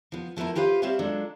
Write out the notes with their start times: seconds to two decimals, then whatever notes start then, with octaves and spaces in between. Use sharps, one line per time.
0.12 F3 B3
0.37 F3 A3 B3 E4 A#4
0.55 F4 G4 B4 C5 D#5 F5
0.82 G3 C4 C5 C#5 E5 F5
0.99 F3 F#3 G#3 D4 A4